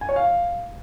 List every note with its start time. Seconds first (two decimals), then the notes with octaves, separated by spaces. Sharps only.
0.01 G#5
0.09 C#5
0.16 F5